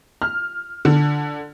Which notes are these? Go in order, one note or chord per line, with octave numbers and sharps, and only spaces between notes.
F6
D3